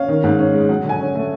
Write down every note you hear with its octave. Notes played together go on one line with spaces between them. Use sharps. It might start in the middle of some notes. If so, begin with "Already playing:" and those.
Already playing: C#4 F5
D#3
G#2
C#4
G#3
F#3 F#5
D3
G#5
C#4
A3